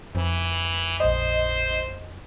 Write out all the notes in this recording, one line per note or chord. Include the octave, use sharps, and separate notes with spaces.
F2 E3
A#1 C5 D#5